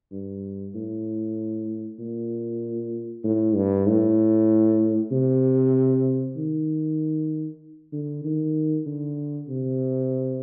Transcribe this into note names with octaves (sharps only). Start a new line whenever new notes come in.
G2
A2
A#2
A2
G2
A2
C3
D#3
D3
D#3
D3
C3